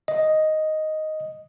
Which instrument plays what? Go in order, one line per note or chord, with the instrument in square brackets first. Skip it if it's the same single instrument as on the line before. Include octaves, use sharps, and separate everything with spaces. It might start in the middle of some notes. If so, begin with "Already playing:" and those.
[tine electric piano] D#5